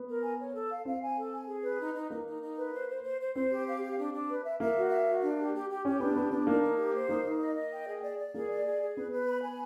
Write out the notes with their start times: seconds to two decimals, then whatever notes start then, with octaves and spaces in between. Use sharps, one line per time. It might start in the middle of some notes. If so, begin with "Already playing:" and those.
Already playing: B3
0.08 A#4
0.23 G#5
0.39 C#5
0.54 A4
0.70 F5
0.85 C4 F5
1.01 G#5
1.16 A4
1.33 G#5
1.47 G#4
1.63 B4
1.79 D#4
1.94 D#4
2.10 A#3 D#4
2.26 D#4
2.42 D#4
2.56 B4
2.73 C5
2.89 C5
3.03 C5
3.20 C5
3.35 C4 C5
3.51 G4
3.67 F5
3.82 G4
3.97 D4
4.13 D4
4.28 B4
4.44 E5
4.60 A#3 E5
4.75 F#4
4.90 E5
5.07 F#4
5.21 D4
5.38 G4
5.54 G4
5.69 G4
5.85 C#4 G4
5.99 B3 D4
6.16 B3 G4
6.31 B3 D4
6.47 A#3 D#4
6.63 D#4
6.78 G4
6.94 C5
7.09 A#3 D#4
7.24 D#4
7.41 D#5
7.55 D#5
7.72 G5
7.87 G#4
8.02 D5
8.18 D5
8.34 A#3 G#4
8.50 D5
8.65 G#4
8.81 G#4
8.97 B3 B4
9.12 B4
9.27 B5
9.43 G#5